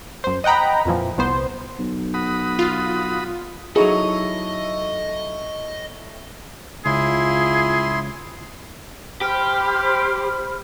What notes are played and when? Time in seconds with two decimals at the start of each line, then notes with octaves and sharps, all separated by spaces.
0.24 F#2 C5
0.44 D#5 F#5 G5 A#5 B5
0.85 F2 A#2 E3 F3
1.18 C2 B3 C5
1.79 B1
2.14 F#4 B5 D#6
2.59 F4
3.76 F#3 D#4 E4 F#4 G#4 A4 C#5 D#5
6.86 C#2 E4 F4 G#4 C6
9.21 G4 C5 B5 F6